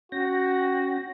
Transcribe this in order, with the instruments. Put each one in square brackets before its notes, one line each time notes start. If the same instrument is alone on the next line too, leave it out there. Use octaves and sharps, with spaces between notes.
[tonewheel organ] C#4 G5 A#6 [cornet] F#4